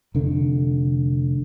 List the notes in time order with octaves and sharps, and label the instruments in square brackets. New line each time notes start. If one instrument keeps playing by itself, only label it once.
[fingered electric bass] F1 D3